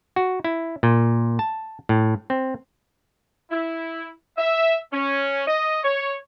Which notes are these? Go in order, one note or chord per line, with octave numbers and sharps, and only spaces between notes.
F#4
E4
A#2
A5
A2
C4
E4
E5
C#4
D#5
C#5